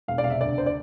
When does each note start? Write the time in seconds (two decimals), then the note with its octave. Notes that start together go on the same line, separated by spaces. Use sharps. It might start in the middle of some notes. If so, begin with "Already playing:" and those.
0.08 E1 F5
0.18 D5
0.24 C3 F5
0.30 E5
0.41 D2 D5
0.57 D2 C5
0.66 D5